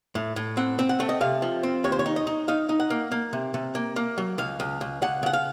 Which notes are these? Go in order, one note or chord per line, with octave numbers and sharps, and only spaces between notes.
A2
A2
C4 F#5
C4
F#5
A3
D#5
C3 F5
F3
C4
D#2 C#5
C5
C#5
D#4
D#5
D#4
D#4 F5
D#4
F#5
A#3
A#3
C3
C3
A#3
A#3
F#3
C#2 F5
C#2
C#2
C#2 F#5
C#3 F#5
F5